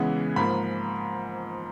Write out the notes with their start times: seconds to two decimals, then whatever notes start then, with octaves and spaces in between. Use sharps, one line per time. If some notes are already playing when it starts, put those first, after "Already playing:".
Already playing: C#3 E3 G#3 B3
0.36 G#2 F3 A#3 B5